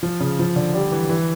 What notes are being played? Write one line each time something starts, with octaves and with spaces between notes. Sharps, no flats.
F3
C#3
F3
D3
G3
E3
E3